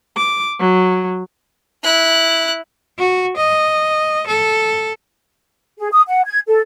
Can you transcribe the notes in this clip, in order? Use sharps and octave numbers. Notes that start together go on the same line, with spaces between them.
D6
F#3
E4 F#6
F#4
D#5
A4
G#4
D#6
F#5
G#6
A4